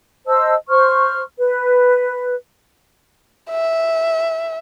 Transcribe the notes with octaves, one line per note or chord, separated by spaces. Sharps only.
C5 D#5 A5 E6
C5 C6 C#6 F6
B4
E5